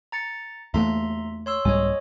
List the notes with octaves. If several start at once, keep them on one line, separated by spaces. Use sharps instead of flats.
A#5 A6 C#7
E2 A3 A#3 E5 A#5 C6
C#5 C6 E6
C2 G#2 G3 C#5 D#5 G#5